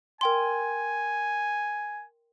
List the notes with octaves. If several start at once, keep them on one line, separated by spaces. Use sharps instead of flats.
A#4 G5 G#5 C6